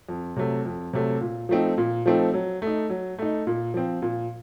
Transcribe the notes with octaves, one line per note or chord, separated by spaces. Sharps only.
F2
C3 F#3 A3
F2
C3 F#3 A3
A#2
F3 A3 C4 D#4
A#2
F3 A3 C4 D#4
F#3
A3 D#4
F#3
A3 D#4
A#2
F3 C4
A#2